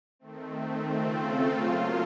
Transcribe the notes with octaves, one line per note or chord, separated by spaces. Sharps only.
D#3 A3 C4
C#3 A3 C4 F4 A4
F#3 A#3 F4